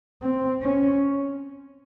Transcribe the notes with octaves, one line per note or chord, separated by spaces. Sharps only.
C4
C#4